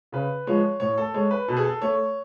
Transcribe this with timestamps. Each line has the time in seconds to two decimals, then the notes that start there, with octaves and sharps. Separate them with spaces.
0.12 C#3 B4
0.47 F3 G#3 C#5
0.80 A2 C#5
0.98 A4
1.14 G#3 C#5
1.31 B4
1.48 B2 A4
1.57 G#4
1.64 A4
1.82 A3 C#5